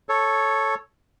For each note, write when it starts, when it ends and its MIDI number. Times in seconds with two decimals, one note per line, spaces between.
0.09 0.75 69
0.09 0.75 73